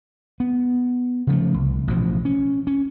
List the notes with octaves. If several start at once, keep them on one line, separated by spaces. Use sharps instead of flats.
B3
C#3 F3 A3
C2
A1 B2 F3
C#4
C#4